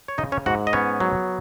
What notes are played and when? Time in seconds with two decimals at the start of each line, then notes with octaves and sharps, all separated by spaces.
0.08 C#5
0.18 C#3 D#4 D#5
0.32 C#4 C#5
0.46 G#2 F#4 F#5
0.67 D#5
0.73 B3 C#4 C#5
1.00 F#3